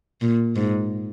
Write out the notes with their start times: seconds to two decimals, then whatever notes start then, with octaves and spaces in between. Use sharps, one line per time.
0.21 A#2
0.56 G#2